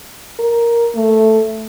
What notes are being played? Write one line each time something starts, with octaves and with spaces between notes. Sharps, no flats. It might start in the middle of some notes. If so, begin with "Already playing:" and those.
A#4
A3